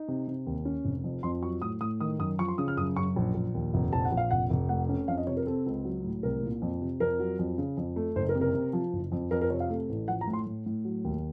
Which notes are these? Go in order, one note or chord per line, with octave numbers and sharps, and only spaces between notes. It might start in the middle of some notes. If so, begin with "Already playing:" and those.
Already playing: D#4
C3
C3
D#2
C#4
F1
F2
F2 C6
F#3 C#6
A2 D#6
A2 D#6
D#3 D#6
F#2 D#6
F3 C#6
C6
C#3 D#6
F6
F#2 D#6
F#2 C#6
A#1
A#1
D#2
F1
A#1 A5
F#5
A#1
F5
F1 F#5
F1
A3 F#5
C#4
F2 F5
D#5
C3 C#5
A#4
C4 A4
C#2
F#3
A2
C2 A#4
A#2
F2
C3
F2 A#4
F#3
F2
C#3
F2
A3
F#1 C5
A#4
C3
A#4
C3
F3
F#1
F2
F2 A#4
A#4
C3 C#5
F5
A3
A1
F3 F#5
A#5
A2
C6
A2
A2
F#3
D#2